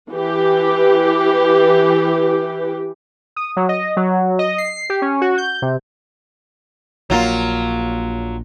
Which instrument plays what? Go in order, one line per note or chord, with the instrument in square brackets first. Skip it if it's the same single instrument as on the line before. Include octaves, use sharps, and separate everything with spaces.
[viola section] E3 G4
[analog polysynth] D#6
F#3
D#5
F#3
D#5
C7
G4
C#4
F#4
G6
C3
[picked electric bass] A#1 A#3 [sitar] F#3 F4